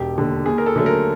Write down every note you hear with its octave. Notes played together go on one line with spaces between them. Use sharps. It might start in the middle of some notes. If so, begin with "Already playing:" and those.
Already playing: E1 G4
D#2 D3
D#2 G#4
A#4
A4
D3 F#3 A3
A#4